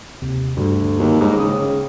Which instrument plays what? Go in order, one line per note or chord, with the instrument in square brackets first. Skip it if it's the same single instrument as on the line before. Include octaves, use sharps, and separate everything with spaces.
[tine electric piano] D#2 C3
[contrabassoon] D2 [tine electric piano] G2 D3 G3
[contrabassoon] D#2
[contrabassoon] G#2 [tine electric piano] A#5 B5 D6
[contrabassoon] C#3 [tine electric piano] G5 D#6